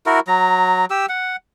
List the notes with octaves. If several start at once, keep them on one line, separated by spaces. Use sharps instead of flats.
E4 F#4 A#4
F#3 A#5
G4 E6
F#5